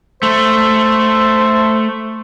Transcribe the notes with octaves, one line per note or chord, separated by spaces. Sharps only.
A3 C5